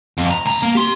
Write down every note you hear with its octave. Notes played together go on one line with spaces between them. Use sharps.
F2
A#5
C2 A#5
A#3
G4 C6